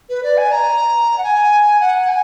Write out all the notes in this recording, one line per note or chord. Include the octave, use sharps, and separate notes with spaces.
B4
D5
G#5
A#5
F#5
G#5
F#5
G#5